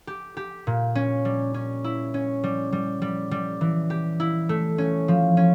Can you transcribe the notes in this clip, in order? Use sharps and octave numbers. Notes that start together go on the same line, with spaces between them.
G4
G4
A#2
C#4
G3
C#4
E4
C#4
G3
G3
G3
G3
E3
G4
E4
A3
C#4
F3
C#4